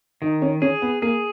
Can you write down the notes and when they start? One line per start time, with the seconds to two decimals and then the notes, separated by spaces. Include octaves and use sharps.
0.22 D#3 D#4
0.42 C#4
0.62 C#4 G#4
0.82 B3
1.02 A#3 G#4